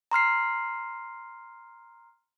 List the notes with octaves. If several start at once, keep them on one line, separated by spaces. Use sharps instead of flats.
A#5 C6 F6 C7